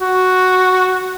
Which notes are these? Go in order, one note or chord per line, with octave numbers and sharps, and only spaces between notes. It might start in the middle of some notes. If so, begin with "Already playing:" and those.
F#4